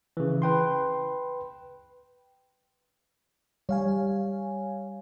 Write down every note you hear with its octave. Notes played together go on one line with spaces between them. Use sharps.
C#3 E3
B4 G5 C6
G3 C#5 F5 G#5